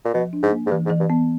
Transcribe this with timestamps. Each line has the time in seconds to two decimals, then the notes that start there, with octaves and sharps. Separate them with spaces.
0.05 A#2
0.14 B2 F3
0.33 D4
0.43 G#2
0.52 A#3
0.67 G#2
0.71 G2 E3
0.86 G#2
0.90 E3
1.00 G2
1.10 B3